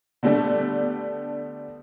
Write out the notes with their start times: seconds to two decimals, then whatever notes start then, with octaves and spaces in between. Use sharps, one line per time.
0.23 D3 G3 A3 B3 D4